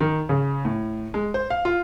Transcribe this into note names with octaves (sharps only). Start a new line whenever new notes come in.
D#3
C#3
A2
G#3
C5
F5
F4